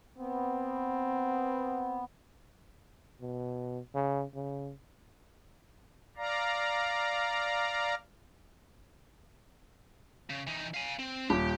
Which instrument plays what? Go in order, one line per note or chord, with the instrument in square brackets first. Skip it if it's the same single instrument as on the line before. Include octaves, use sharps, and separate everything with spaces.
[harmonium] B3 [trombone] C4
[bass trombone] B2
C#3
C#3
[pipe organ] D5 F5 A#5
[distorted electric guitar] C#3
E3 D#4
F5 G#5
C4
[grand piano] D#1 [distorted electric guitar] G4